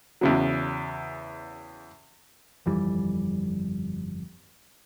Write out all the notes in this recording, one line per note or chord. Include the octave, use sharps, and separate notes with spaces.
E2 C#3 F#3
G1 F2 E3 G3